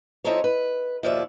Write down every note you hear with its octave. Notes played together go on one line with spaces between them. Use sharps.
F3 C4 D#4 E4 A4 C#5
B4
D#2 B2 F3 C#5 D5 E5